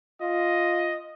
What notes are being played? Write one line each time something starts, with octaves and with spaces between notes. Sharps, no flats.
F4 D#5